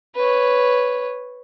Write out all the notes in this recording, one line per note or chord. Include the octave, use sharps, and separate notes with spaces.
B4 C#5